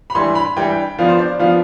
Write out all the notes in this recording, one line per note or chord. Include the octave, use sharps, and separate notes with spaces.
B5
E3 G3 D4 C6
B5
E3 G3 D4 G5
F3 B3 D4 F5
C5
D5
F3 B3 D4 F5